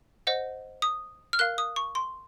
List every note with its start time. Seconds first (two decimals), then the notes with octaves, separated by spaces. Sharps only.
0.27 C5 D#5 F#5
0.82 D#6
1.33 F6
1.39 A#4 F5 F#6
1.58 D#6
1.76 C#6
1.95 C6